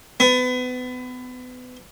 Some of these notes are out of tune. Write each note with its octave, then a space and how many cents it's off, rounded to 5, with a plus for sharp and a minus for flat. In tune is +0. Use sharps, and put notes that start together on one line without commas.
B3 +30